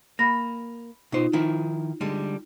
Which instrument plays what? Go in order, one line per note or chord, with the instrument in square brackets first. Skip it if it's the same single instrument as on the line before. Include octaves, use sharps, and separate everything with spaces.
[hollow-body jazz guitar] A#3 [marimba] B5 A#6
[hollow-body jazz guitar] B2 C5 [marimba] D#4 F4
[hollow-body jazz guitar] D#3 F3 E4
D3 G3 G#3